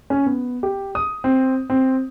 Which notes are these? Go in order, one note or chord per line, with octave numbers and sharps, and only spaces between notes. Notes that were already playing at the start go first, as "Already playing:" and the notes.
C#4
B3
G4
D#6
C4
C4